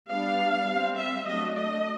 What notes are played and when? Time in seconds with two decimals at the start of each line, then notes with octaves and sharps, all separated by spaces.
0.10 G3 B3 D4 F5
0.68 G3 C4
0.97 E5
1.26 F#3 A3 D4 D#5
1.55 D#5